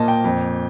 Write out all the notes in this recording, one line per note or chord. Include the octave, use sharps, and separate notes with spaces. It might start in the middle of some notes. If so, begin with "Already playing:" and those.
Already playing: A#2 A#3 D#5 A5
G5
F2